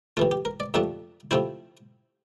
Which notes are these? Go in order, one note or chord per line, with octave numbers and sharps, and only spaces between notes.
C3 E3 A3 F4
G4
A#4
D5
F2 C3 F3 A3 D4 E5
C3 F3 A3 C4 E4 C5